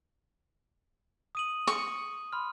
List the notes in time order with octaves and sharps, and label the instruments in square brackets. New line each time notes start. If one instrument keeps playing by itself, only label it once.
[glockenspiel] D#6 D#7 F#7
[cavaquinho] C#6
[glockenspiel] B5 C6 F6